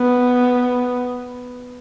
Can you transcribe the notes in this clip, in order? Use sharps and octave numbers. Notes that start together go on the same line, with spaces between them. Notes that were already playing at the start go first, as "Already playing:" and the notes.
Already playing: B3